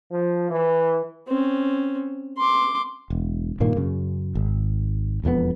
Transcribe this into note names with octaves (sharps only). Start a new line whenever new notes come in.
F3
E3
C4 C#4
C6 D6
E1
G2 A#2 D#3 A#3
F#2 C#3
G#1
E1 F2 E3 B3